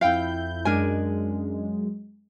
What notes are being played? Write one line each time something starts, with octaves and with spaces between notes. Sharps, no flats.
F2 E4 F5 G5 G6
F#2 G#3 D4 A#4 G#5